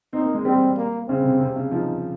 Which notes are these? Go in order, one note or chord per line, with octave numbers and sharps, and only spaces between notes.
C4 D#4
A#3
G#3
G3 C4
A#3
C#3 C4
C3
C3
C#3
F3 D#4